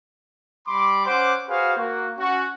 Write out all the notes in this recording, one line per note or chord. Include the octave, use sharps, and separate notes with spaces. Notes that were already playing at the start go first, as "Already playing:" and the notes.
G3 B5 C6 D6
C#4 C5 F#5 D6
F#4 G#4 B4 C5 F5
A#3 F#4
C#4 F#4